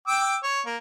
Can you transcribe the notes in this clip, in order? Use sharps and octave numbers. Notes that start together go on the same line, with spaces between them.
G5 D6 E6
C#5
A#3